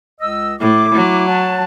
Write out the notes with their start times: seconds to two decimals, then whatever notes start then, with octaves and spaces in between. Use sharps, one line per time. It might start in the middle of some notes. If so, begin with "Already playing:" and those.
0.20 C#2 D#5 E6
0.60 A2 E4 D6
0.95 F#3
1.27 C#5 F#5 A5